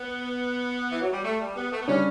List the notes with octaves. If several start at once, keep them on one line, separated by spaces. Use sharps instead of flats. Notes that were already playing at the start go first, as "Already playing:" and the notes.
Already playing: B3
E3
F#3
G3
A3
G3
B3
A3
B3
C#3 G3 C#4 D4